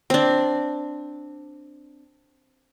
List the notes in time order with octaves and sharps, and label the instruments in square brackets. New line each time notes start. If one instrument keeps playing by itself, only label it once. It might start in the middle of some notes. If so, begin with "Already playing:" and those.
[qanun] C4 D4